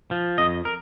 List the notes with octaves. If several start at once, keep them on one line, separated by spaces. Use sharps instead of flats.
F3
F2 D#5
A#4